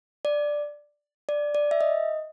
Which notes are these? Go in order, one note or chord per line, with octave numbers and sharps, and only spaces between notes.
D5
D5
D5
E5
D#5